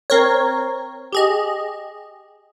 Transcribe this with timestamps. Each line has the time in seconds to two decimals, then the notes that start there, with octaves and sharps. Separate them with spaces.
0.10 C4 A#4 C#5
1.12 G4 G#4 D#5